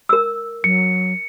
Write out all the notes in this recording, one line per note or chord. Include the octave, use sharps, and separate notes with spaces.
A#4 E6
F#3 C#7